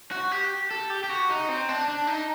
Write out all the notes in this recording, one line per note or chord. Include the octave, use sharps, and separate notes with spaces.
F#4
G4
A4
G4
G4
F#4
D#4
C4
D4
D4
D#4